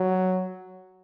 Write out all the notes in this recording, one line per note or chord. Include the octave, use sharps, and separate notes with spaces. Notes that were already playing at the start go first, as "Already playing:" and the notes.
Already playing: F#3